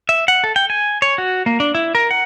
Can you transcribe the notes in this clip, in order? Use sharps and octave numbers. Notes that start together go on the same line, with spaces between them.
E5
F#5
A4
G5
G#5
C#5
F#4
A#3
D4
E4
A#4
F#5